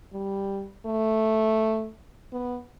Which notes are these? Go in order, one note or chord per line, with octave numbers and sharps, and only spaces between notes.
G3
A3
B3